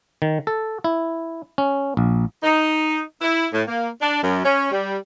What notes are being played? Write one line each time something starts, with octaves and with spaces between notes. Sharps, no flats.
D#3
A4
E4
C#4
A#1
D#4
E4
A2
A#3
D4
F#2
C#4
G3